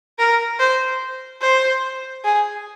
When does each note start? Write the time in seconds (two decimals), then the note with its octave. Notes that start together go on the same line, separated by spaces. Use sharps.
0.19 A#4
0.60 C5
1.41 C5
2.24 G#4